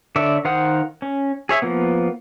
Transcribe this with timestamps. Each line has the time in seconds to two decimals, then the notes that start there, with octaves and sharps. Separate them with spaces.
0.16 D3 C#5 D5 E5
0.45 D#3 C5 F5 F#5 D#6
1.02 C#4
1.49 G#4 C#5 E5
1.62 F3 A#3 B3